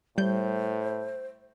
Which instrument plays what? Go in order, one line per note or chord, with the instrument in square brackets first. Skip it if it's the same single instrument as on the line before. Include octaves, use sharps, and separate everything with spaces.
[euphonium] A2 [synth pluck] G3 G6 [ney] C5